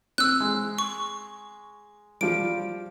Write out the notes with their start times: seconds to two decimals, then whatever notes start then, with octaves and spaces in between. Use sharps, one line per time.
0.18 C4 E6 F#6
0.40 G#3
0.79 C#6
2.21 F3 G3 D7